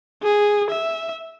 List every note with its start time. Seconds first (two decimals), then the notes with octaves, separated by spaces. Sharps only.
0.23 G#4
0.70 E5